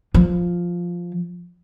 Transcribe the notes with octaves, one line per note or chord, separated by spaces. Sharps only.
F3